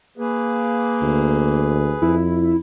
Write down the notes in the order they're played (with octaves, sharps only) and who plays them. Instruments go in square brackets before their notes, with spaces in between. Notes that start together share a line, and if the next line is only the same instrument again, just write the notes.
[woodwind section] A#3 [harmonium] G#4 B4
[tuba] D2
[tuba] F2 [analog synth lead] E4